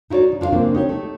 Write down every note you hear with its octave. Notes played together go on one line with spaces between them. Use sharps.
D#4 E4 F#4 C#5 D5
E2 C#3
D4 F4 D5 F5
C#3 G#3 A#3 C4 D4
D#4 G4 C#5
A3